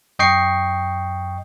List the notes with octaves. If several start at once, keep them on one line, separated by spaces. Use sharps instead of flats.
F#2 D#5 G5 C#6 C7